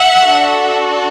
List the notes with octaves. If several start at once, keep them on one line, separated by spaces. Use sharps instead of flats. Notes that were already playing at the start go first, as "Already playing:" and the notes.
Already playing: E5 F#5
D4 F#4 A4